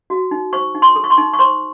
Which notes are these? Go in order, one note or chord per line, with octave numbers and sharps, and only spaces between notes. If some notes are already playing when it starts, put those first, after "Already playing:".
F#4
D#4
C5 C#6
D#4
C6
A4
C#6
C6
D#4
C#6
C5 C6